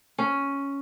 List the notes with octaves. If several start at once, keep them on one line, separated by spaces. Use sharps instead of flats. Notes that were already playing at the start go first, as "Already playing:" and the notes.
C#4